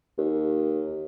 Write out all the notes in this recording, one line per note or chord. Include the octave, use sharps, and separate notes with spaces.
D#2